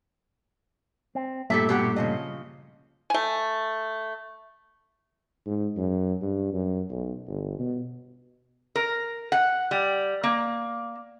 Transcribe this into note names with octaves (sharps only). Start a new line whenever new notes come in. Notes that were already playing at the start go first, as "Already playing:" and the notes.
C4
G2 A#2 A3 G4 A4 E5
B2 G4 F#5
C#3 F3 D#5
A3 G#5
G#2
F#2
G2
F#2
B1
G1
B2
A#4
F#5
G3
A#3